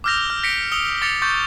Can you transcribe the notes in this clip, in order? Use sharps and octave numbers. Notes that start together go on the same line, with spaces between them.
D6 E6 F6 G6 A#6 F7
F6
A#6 B6 C#7 D7
D#6 E6 C#7 F7 G7
D6 A6 A#6 C#7 F7 G7
C#6 D6 G6 A6